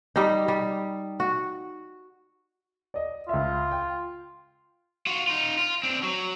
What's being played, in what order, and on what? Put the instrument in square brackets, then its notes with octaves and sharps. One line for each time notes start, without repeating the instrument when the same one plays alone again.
[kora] G3 D#4
G3
F#4
[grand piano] D5 D#5
[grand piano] C#2 E5 [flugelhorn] F4
[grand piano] G5
[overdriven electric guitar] F4 F#4
D#4 F4
F4
C4 D4
F#3